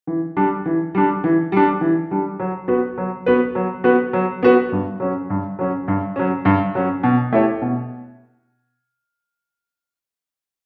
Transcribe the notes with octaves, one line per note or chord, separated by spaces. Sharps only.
E3
G3 D4
E3
G3 D4
E3
G3 D4
E3
G3 D4
F#3
B3 F#4 B4
F#3
B3 F#4 B4
F#3
B3 F#4 B4
F#3
B3 F#4 B4
G2
F#3 C#4
G2
F#3 C#4
G2
F#3 C#4
G2
F#3 C#4
B2
A3 E4 G4 C#5
B2